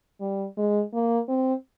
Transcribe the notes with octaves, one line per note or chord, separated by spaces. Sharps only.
G3
G#3
A#3
C4